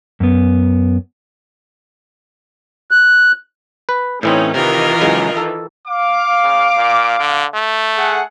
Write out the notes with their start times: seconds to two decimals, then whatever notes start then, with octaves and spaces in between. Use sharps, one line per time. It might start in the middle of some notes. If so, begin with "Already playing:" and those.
0.20 F#2 B3
2.91 F#6
3.89 B4
4.23 A2 E3 C4 C#4 D#4
4.54 C3 D#3 E3 F4 A#4 D#5
5.01 C#3 F#3 G#3
5.37 A4
5.87 F5 D6
6.43 C#3
6.76 A#2
7.19 D3
7.54 A3
7.96 G#4 A4 F#5